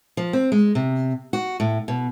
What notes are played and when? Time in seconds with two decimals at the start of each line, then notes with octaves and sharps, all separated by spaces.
0.17 F3
0.33 C4
0.52 G#3
0.75 C3
1.33 F#4
1.60 A2
1.88 B2